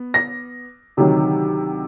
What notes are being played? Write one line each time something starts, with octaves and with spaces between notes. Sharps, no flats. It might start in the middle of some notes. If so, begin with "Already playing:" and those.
Already playing: B3
A#6
D2 C3 D#3 F#3